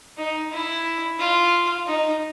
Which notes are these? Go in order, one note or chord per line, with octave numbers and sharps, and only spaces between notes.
D#4
E4
F4
D#4